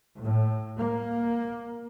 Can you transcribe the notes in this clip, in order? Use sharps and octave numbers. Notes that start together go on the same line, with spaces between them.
A2
A#3